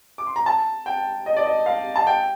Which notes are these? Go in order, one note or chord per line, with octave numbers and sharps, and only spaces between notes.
D6
C6
A#5
A5
G5
D#5
D5
D#5
F5
A5
G5